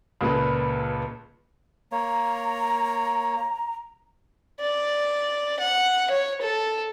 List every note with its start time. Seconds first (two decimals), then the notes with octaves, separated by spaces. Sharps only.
0.21 C#2 A#2 A#3 F4 A4 B4
1.92 A#3 C#5 A#5
4.61 D5
5.60 F#5
6.10 C#5
6.41 A4